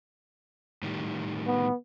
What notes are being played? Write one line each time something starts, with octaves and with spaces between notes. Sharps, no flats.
A2 D#3 G3
B3